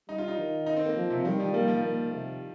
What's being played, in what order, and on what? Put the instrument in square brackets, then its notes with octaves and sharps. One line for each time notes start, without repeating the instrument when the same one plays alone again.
[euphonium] G3 [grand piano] D#4
[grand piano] F4
D#4
[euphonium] D#3
[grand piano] D#4
C4
A#3
[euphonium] F3
[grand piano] C3
[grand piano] D#3 [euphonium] G3
[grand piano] F3
[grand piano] G3 [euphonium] A#3
[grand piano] F3
[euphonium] A#3
C3